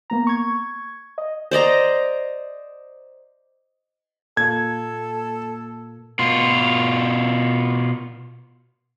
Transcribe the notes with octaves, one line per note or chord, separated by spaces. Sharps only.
A#3 B3 A#5
C#6 G#6
D#5
C5 D5 D#5 A#5
A#2 A#3 A4 G#6
B2 F4